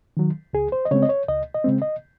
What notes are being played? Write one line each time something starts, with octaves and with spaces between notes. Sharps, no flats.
D#3 F#3
C#2 G#4
C5
D#5
C#3 G#3 C4 C#5
D#5
C#5
C#2 D#5
D#5
C#3 G#3 C4
D#5